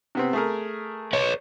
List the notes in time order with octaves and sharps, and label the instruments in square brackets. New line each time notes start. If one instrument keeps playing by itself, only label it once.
[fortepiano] C3 B3 C4
A3 G#4 A#4
[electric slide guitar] B4 C#5